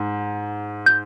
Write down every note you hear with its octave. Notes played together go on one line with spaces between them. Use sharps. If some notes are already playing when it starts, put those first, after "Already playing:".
Already playing: G#2
G6